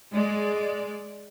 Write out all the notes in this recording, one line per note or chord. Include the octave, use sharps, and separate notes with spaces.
G#3 D5